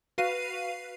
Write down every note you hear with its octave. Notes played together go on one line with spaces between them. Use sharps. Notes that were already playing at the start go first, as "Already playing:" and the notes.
F#4 B4 F5 C7 D#7